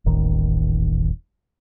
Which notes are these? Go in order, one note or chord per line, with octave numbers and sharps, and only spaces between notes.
D#1 A1 D#3